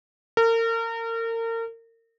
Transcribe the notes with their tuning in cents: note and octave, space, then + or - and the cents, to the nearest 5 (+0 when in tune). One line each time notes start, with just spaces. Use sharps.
A#4 -35